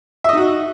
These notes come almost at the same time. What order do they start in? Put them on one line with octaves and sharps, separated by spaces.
E5 D#5 D#4 F#4